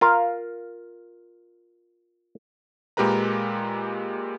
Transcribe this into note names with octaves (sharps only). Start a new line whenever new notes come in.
F4 A#4 F5
A#2 G#3 G4 A#4 B4 A#5